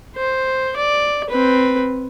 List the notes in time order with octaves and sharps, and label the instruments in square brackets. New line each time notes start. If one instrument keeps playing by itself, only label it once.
[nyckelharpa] C5
D5
C4 B4